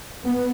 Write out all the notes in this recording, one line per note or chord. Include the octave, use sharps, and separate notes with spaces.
B3